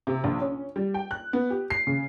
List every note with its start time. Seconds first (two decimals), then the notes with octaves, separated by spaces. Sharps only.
0.07 C3
0.24 A#1
0.41 C#4
0.76 G3
0.94 G5
1.11 F#6
1.33 B3
1.50 G4
1.70 C7
1.87 C#3